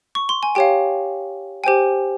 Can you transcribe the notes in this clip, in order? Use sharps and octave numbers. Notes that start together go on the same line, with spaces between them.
C#6
C6
G#5
G4 C#5 F5 G5
G4 C5 G5 G#5